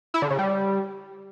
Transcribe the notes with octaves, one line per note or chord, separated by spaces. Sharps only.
E4
D3
C#3
G3